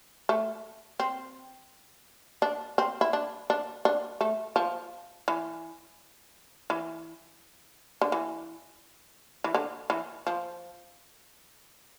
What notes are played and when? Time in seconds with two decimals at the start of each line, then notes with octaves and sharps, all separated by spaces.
0.29 A3
1.00 C4
2.42 D4
2.78 C4
3.01 E4
3.13 D4
3.50 D4
3.85 D4
4.21 A3
4.56 F3
5.28 E3
6.70 E3
8.01 D3
8.12 E3
9.44 E3
9.55 D3
9.90 E3
10.27 F3